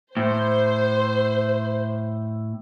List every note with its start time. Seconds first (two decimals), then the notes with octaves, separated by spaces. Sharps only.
0.17 A2 C5